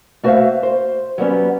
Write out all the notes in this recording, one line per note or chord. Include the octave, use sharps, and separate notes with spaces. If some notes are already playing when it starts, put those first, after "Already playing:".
A3 F#4 B4 C5 E5 F5
C5
F#3 G3 B3 C#4